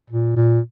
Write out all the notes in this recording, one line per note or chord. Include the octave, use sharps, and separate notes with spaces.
A#2
A#2